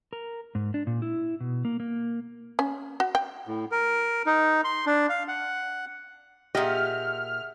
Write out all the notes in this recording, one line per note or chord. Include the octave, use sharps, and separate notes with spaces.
A#4
G#2
D4
A#2
E4
B2
A#3
A#3
C#4
F#4
G5
A2
A#4
D#4
C6
D4
F5
F#5
A#2 G4 G#4 D#5 E5 F#5 F6